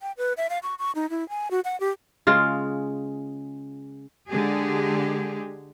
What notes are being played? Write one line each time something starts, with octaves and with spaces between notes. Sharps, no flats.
G5
B4
E5
F5
C#6
C#6
D#4
E4
G#5
F#4
F#5
G4
C#3 G#3 F4
D3 G#3 G4 G#4